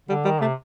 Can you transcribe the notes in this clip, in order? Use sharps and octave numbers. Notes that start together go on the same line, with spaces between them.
D3 G3
D#3 G3
C3 A3